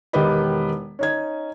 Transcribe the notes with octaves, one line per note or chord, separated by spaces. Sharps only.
E1 D#3 G4 B4 D#5 B5
C#4 D#4 G#6